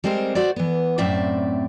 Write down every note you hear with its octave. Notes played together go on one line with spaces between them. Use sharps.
G3 G#3 C4 A#4 C5
F#4 C5 D5
E3 B3
F#2 A2 C4 D5 E5